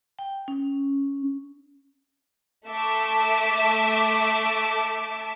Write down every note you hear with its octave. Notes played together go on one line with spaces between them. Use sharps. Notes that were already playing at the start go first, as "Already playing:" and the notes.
G5
C#4
A3 E5 A5 D6